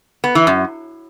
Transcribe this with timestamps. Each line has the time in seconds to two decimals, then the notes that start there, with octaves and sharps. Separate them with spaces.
0.24 B3
0.35 E3
0.47 F#2